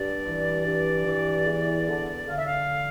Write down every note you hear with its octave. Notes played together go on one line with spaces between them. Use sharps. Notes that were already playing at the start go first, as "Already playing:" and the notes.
Already playing: G2 D5
E3
G2
E3
E2
D3
D3 F5
E5
F5